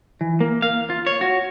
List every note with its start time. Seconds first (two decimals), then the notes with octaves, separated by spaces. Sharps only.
0.21 E3
0.40 A#3
0.62 F5
0.90 F4
1.07 C#5
1.21 F#4